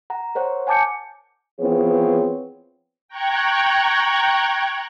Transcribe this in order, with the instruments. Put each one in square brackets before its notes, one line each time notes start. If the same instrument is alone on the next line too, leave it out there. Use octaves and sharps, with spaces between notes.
[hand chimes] F#5 A#5
A#4 C5 C#5 F#5
F#5 G#5 A5 D6 G6 C#7
[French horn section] E3 F3 B3 C4 G#4 C#5
[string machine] G5 A#5 C#6 F#6 G#6